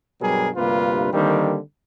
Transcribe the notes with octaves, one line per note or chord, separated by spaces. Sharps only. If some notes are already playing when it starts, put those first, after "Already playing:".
G2 B2 F#3 G3 G#4 A#4
D2 G2 C3 A#3 F4 B4
D3 D#3 G3 A#3 C4 D4